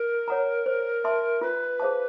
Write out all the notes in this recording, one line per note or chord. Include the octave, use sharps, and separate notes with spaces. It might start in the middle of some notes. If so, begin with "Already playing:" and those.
Already playing: A#4
C#5 F#5 A#5
C5
E5 A5 C6
F4 B4
G#4 C5 F5 A5